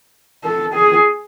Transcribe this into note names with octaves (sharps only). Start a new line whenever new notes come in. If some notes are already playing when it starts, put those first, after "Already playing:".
A4
G#4